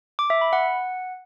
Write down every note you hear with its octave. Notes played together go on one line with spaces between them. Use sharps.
D6
E5
B5
F#5